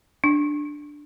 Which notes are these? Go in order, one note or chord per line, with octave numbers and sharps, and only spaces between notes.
D4